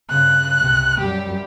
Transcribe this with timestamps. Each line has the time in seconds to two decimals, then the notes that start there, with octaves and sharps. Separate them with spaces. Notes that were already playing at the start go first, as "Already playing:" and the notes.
0.10 G2 C#3 F#6
0.58 C2 C3
1.00 F#2 G3 G4